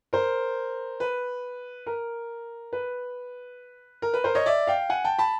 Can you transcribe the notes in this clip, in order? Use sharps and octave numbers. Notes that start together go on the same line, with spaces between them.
A#4 C5
B4
A#4
B4
A#4
B4
A#4 C5
C#5 D#5
D5 E5
F5 G5
F#5 G#5
G5 A5
A5 B5